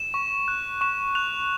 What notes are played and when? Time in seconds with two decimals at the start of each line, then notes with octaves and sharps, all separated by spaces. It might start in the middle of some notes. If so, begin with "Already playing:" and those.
Already playing: E7
0.14 C#6
0.48 F#6
0.81 C#6 E7
1.15 F#6 F7